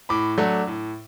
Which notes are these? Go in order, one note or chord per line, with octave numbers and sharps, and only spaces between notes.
A2 B5 D6
F#3 A3 D4
A2